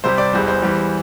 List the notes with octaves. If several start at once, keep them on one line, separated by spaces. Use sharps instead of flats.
C2 C3 G3 C5
D5
E1 E2 E3 G3 C5
C5
E2 E3 G3